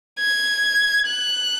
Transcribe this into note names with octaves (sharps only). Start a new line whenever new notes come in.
G#6
F#6